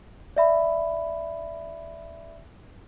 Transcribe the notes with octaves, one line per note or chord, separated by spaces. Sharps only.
D5 E5 B5